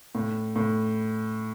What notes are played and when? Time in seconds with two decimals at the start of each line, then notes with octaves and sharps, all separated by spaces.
0.15 A2
0.56 A2